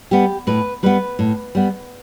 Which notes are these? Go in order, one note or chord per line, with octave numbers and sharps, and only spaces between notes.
G3 B3 G4
A2 B4
G3 B3 B4
A2
G3 B3